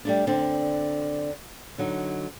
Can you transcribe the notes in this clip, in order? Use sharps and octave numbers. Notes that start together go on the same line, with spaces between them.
G3 A3 D4
D3 C4 D4
D3 F#3 D#4